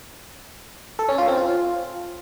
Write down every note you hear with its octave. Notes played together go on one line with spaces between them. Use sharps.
A4
C#4
F4
C4
F4